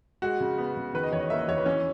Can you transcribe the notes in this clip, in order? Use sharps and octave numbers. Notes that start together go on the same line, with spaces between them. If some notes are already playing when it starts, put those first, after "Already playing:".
G#3 F#4
C#3
B3
C#3
D#3 B4
D#5
E2 C#5
D#5
A#3 E5
D#5
E2 C#5
B4
E3 C#4